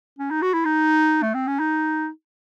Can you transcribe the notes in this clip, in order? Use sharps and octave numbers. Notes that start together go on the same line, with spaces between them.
C#4
D#4
F#4
E4
D#4
A3
C4
C#4
D#4